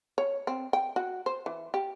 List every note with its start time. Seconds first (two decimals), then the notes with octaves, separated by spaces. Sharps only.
0.18 C#5
0.47 C4
0.73 G5
0.96 F#4
1.26 C5
1.46 E3
1.74 G4